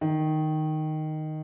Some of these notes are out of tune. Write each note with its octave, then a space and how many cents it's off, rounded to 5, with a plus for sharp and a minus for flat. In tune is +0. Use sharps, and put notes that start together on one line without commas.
D#3 -5